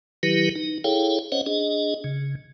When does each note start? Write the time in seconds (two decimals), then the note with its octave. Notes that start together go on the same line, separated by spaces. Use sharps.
0.23 D#3 F#3 E4 G4 B4
0.55 D#4
0.84 E4 G#4 A4 C#5 F5 G5
1.32 C#4 C5 C#5 D#5 F#5
1.46 D4 G#4 D#5
2.04 C#3